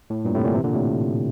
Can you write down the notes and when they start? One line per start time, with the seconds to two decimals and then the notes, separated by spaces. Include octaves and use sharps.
0.10 A2
0.25 G2 A#2
0.35 A2 C3
0.45 A#2 D3
0.55 C3 E3
0.64 A#2 D3
0.74 A2 C3